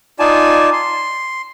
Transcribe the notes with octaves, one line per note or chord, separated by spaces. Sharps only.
D#4 F4 D5 G#5 A5
C6